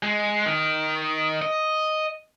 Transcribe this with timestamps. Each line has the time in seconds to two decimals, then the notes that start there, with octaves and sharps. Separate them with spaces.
0.03 G#3
0.46 D#3
1.42 D#5